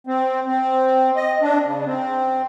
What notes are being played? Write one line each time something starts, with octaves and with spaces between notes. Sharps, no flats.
C4
C4
D#5
D4
C#3
C4